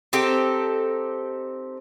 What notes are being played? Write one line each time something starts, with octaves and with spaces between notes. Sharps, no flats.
C4 D#4 G4 A4